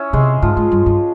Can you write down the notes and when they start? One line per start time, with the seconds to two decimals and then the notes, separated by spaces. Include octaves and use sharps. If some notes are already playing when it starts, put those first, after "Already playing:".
Already playing: C#4 E4 C#5 E5
0.13 C3 G#3 G#4
0.42 G#2 F3 F4
0.57 G#2
0.71 G2
0.86 G2